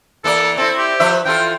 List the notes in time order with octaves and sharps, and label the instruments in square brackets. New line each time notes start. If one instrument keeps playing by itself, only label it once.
[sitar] E3 A#3 D5 [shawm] A4
[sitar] C4 E4 [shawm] A4
[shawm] G4
[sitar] F3 B4 E5
[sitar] E3 F4 A4 [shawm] G5